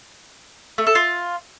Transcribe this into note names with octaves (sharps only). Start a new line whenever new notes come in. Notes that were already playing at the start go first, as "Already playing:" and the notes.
A3
A4
F4